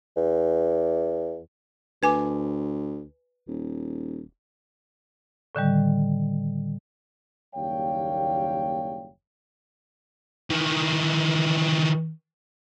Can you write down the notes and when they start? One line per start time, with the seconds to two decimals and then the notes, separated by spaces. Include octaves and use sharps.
0.17 E2
2.03 D2 B4 G#5 D6
3.47 D#1
5.55 A2 D3 D#3 G3
7.54 F#1 D#2 G3 C#5 F5 G5
10.50 D#3 E3